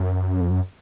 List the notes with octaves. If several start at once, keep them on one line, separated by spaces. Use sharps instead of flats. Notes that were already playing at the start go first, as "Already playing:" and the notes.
Already playing: F#2
F2
F#2